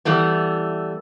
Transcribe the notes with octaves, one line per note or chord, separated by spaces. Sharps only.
E3 G3 A3 B3